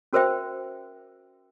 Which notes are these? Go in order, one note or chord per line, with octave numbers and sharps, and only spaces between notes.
C#4 F#4 A#4 C5 E5 G5